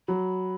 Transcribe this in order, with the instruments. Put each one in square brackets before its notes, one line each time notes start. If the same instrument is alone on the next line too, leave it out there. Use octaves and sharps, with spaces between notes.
[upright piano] F#3 [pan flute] B5